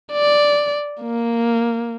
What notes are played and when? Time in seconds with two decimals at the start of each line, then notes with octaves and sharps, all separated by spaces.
0.12 D5
1.02 A#3